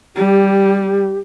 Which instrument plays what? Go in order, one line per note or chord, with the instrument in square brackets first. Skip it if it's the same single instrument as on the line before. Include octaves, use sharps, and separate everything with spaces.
[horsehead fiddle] G3 [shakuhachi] G4